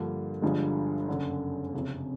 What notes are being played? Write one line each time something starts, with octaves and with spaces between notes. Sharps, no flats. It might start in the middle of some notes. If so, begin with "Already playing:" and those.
Already playing: G2 D3 F3 A#3
G1 G2 D3 F3 G#3
F#1 F#2 D3
F#1 F2 C3